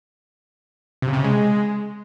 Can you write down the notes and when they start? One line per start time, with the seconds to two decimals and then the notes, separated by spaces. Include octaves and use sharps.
1.02 C3
1.08 C#3
1.13 C3
1.19 C#3
1.24 G#3